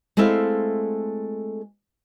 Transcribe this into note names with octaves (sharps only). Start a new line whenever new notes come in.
G#3 A3 C4 E4 A4 F5